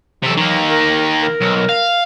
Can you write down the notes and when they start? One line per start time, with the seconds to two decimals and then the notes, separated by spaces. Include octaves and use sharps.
0.23 C3 E3 F#3 A4
0.37 D#3 A#3
0.69 A#4
1.22 A#4
1.41 B1
1.69 F5